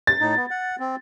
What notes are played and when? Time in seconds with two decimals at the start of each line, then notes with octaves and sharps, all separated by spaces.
0.07 A6
0.20 A2 D#4
0.36 B3
0.50 F#5
0.80 C4